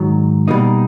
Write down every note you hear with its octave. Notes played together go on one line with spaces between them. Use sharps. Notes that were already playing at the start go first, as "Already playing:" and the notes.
Already playing: G#2 D#3 F#3
B2 G3 A#3 D#4